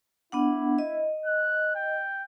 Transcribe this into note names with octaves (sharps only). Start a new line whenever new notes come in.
B3 D4 E4 F#5
D#5
F#6
G5